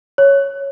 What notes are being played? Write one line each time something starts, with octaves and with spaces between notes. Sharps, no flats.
C#5